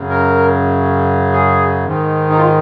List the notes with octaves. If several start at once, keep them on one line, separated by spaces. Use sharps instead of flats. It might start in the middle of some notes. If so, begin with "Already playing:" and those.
Already playing: F#2 C#3
A#4
G#4
G#2 D#3
D#4
F4